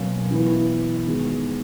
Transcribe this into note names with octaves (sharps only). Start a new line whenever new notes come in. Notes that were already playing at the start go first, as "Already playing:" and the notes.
Already playing: B2 F#3 A#3 C#4
E3 B3 E4 B4
D#3 G#3 B3 F#4